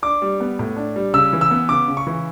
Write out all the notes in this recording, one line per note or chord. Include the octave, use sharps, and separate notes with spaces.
D4 D6
G3
B3
A2
D4
G3
C#3 E6
E3
E6
B3
C#3 D6
C#3
C#6
E3